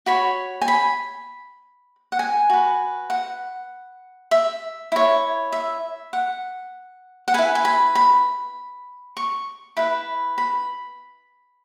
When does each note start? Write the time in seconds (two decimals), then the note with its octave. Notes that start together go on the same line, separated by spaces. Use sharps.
0.06 F#4 C#5 B5
0.61 G#5
0.68 B5
2.12 F#5
2.19 G#5
2.50 F#4 B4
3.10 F#5
4.31 E5
4.92 E4 C#5
5.52 E5
6.13 F#5
7.28 F#5
7.34 E4 B4 G#5
7.55 G#5
7.65 B5
7.95 B5
9.17 C#6
9.77 E4 B4 B5
10.38 B5